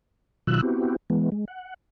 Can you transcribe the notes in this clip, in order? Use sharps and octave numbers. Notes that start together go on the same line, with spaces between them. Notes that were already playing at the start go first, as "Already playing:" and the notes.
B2 D#3 F#3 F4 E6 F#6
B3 C4 E4 F#4 G4
E3 G#3 B3
G#3
F#5